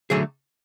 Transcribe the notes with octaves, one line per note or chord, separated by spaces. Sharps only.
D3 F#3 A3 G#4